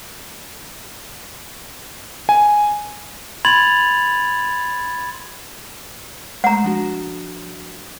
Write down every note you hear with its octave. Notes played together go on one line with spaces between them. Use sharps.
G#5
B5 C6 G#6 A6 F7 F#7
G#3 A3 F#5 A#5
F3 D4 F#4